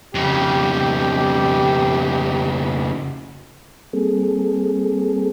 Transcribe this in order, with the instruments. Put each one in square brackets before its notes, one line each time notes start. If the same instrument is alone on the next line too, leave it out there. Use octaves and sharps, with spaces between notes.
[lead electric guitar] F2 C#3 [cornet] G4
[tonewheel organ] G3 A#3 C4 G#4 A4